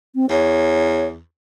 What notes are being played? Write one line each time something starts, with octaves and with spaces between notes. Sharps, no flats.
C4
E2 C#5